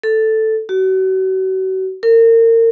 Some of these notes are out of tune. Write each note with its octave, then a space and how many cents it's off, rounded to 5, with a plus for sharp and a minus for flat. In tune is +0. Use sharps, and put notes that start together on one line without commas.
A4 +0
F#4 +35
A#4 -35